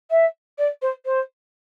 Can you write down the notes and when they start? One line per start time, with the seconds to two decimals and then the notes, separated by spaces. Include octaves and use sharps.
0.10 E5
0.58 D5
0.82 C5
1.05 C5